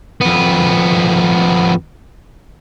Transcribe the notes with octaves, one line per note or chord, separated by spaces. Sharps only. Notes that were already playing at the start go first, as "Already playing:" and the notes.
F2 B3